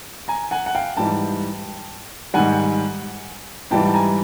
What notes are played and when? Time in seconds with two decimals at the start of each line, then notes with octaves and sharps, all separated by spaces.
0.28 G#5 A#5
0.51 F#5 G#5
0.66 F#5
0.75 F5 G5
0.97 G#2 E3 G3 G5 A5
2.34 G#2 D#3 G3 F#5 G#5
3.71 G#2 E3 G3 G5 A5
3.88 A5
3.94 G#5 A#5